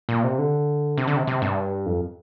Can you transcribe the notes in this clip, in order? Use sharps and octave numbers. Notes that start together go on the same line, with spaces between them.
A#2
C3
D3
C3
D3
C3
C3
G2
F2